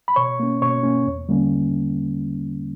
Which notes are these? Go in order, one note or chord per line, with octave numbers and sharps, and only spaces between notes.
B5
B2 C#5 C#6
A#3 C#4
B2 C#5 C#6
A#3 C#4
E2
D3 G3 A#3 C#4